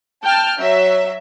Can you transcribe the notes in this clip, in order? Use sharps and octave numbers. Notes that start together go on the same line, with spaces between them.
G5 A5 F6
F#3 E5